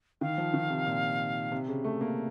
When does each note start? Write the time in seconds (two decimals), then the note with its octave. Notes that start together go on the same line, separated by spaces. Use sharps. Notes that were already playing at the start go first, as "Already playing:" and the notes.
0.21 D#3 F5
0.38 F3
0.54 D#3
0.70 C3
0.86 A#2
1.52 C3
1.68 C#3
1.84 A3
2.01 A#3